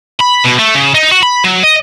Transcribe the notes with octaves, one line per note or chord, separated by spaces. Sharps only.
B5
B2
A3
C#3
D#4
F#4
B5
F#3
D#5